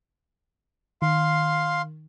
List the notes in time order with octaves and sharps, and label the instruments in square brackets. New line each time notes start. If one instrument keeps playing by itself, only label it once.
[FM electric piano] D#3 [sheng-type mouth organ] F5 C6